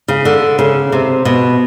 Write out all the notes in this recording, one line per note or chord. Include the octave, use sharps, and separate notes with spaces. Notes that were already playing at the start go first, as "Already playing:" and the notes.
C#3
D3
C#3
C3
B2